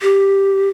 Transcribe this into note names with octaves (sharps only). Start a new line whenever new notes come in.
G4